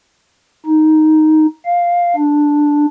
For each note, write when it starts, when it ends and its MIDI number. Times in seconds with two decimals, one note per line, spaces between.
0.66 1.46 63
1.65 2.15 77
2.16 2.86 62